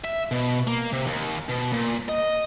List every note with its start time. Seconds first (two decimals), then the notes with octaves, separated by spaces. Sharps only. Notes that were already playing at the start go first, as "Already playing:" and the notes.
0.04 E5
0.31 B2
0.67 A#3
0.93 C3
1.07 D#2
1.49 B2
1.73 A#2
2.09 D#5